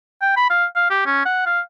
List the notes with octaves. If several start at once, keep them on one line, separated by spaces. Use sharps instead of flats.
G5
B5
F5
F5
G4
C#4
F#5
F5